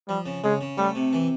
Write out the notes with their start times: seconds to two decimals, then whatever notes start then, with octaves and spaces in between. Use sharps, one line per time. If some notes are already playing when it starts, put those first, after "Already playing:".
0.08 F3 G3
0.26 C#3
0.44 C#3 G#3
0.61 C#3
0.78 G3 A3
0.95 C3
1.13 E3